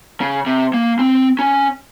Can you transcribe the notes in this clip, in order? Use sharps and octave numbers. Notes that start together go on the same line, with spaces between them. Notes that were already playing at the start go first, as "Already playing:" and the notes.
C#3
C3
A#3
C4
C#4